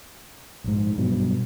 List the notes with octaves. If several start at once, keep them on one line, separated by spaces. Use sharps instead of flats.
A#1 G#2
G2 B2 F#3